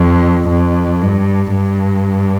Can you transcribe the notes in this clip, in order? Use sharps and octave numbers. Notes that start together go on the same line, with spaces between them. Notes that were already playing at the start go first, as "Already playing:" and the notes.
Already playing: F2
F2
G2
G2